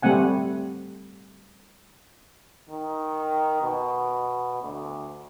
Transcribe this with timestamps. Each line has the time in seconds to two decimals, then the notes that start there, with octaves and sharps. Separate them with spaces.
0.02 G3 A3 C4 F#5 G#5
2.70 D#3
3.62 B2
4.63 D2